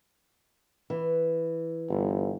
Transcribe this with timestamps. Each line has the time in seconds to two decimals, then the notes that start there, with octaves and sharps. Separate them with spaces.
0.90 E3
1.89 G1